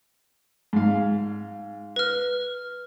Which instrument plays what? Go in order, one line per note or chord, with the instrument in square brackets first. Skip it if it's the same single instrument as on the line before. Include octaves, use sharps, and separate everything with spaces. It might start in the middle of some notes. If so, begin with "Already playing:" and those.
[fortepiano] G#2 F5
[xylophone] B4 F6